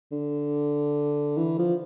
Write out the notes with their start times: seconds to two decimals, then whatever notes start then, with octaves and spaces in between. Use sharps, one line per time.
0.12 D3
1.37 E3
1.59 F3